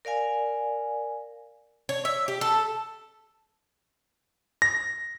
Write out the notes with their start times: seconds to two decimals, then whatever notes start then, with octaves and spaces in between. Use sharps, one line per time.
0.05 A#4 D5 F5 G#5
1.89 C#5
2.05 E5
2.28 G4
2.41 A4
4.62 A#6